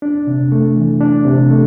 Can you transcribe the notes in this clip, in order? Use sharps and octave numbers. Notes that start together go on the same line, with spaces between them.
D4
C3
A3
E3
D4
C3
A3